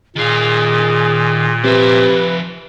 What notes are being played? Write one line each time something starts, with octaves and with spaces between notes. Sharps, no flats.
A#2 D#3 G#4 F5
C3 F3 B4 E5